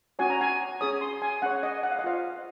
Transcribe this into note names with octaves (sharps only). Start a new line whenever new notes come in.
C#4 F#4 C#5 G#5
A#5
G#5
C#4 G#4 C#5 D#6
C6
G#5
C#4 G#4 C#5 F#5
D#5
F#5
F5
D#5
F4 C5 F5